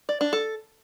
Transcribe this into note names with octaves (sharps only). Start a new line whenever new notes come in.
D5
D4
A4